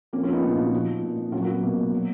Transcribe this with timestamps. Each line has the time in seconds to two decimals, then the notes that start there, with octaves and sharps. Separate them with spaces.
0.13 F3 A#3 C#4
0.23 C#4 F4
0.28 F3 B3 D#4
0.42 A#2 C#4 F4
0.57 A#2 D#4 F#4
0.72 F3
0.88 F3
1.03 A#2
1.18 A#2
1.32 F#3 C#4 F4
1.42 F#4 A#4
1.48 F#3 B3
1.63 B2 A#3
1.78 B2
1.92 F#3